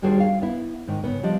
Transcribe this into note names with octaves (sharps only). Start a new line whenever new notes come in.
D#2 G3 D4 F#4 G#4 C5
F5
B3 E4
G#2 D#3
C#3 B3
F3 G3 D4 D#5